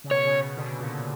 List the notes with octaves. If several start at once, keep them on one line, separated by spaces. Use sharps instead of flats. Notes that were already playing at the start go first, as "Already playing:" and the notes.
C#3
B2 C#5
C#3
B2
B2 D3
A#2 C#3